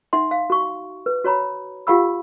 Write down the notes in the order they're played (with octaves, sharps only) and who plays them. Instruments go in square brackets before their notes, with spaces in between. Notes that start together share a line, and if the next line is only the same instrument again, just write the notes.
[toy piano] D#4 E5 F#5 C6
F5
F#4 C#6
B4
F#4 C#5 A#5 B5
F4 G4 F5 F#5 B5 E6